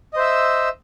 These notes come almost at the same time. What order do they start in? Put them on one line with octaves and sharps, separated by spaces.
D#5 C5 E5 E6